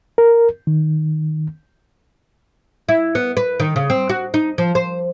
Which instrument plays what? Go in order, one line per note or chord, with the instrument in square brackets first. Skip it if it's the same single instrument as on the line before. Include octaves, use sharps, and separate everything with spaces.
[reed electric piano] A#4
D#3
[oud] E4
B3
B4
D#3
C#3
C4
F#4
D#4
F3
C5